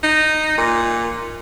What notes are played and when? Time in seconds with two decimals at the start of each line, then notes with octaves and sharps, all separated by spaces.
0.03 D#4
0.58 A#2